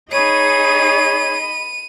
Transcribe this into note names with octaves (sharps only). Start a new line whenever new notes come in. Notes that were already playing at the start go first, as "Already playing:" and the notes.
D#4 G#4 C#5 D#5 B5 D#7